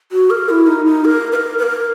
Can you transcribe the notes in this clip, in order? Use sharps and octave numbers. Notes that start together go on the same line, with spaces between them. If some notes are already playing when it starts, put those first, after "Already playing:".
F#4
A#4
E4
D#4
D#4
A#4
B4
A#4
B4
A#4